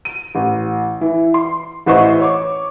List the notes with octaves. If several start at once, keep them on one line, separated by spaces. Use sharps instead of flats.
D#7
A1
E3
C6
A1 E3 B4 C5 D#5 C#6
C#5 C#6 D6